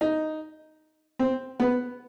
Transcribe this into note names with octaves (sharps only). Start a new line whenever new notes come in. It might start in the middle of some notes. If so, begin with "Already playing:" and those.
D#4
C4
B3